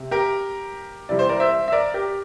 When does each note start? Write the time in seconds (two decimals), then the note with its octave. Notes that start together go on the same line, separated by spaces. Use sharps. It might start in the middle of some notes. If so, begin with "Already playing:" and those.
Already playing: C3
0.11 G4 A#4
1.09 C3 E3 G3 D5
1.19 C5
1.29 A#4 D5
1.40 C5 E5
1.68 E5
1.72 A#4 D5
1.94 G4 A#4